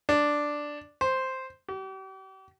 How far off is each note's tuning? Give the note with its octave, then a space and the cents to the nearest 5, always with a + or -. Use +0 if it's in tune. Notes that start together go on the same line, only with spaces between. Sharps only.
D4 +0
C5 +0
G4 -40